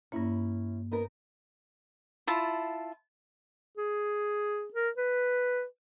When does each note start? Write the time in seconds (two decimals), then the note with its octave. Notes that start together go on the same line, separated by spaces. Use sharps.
0.12 G2 A#3 C#4 E4
0.91 B3 D#4 A#4
2.27 E4 F4 A5
3.78 G#4
4.74 A#4
4.97 B4